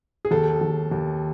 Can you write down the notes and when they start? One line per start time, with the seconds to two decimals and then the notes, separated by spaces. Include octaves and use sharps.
0.25 G#4
0.31 D#2 A4
0.61 D#2
0.91 D#2